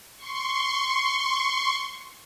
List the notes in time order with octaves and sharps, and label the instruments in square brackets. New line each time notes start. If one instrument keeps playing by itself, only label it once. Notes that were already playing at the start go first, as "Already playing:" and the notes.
[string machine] C6 C#6